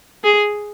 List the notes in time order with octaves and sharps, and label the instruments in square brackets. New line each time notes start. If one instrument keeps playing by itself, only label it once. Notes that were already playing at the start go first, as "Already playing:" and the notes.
[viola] G#4